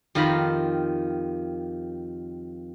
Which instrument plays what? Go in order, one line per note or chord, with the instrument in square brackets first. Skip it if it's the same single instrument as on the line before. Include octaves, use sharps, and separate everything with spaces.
[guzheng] F2 D#3 F4 G4 A#5 B5